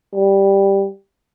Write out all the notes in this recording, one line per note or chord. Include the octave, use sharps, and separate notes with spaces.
G3